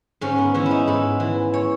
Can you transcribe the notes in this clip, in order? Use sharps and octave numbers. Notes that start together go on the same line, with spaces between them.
G#2 C#4
B3
E3 C#4
E4
D#4
G#2 E4
E3
C#5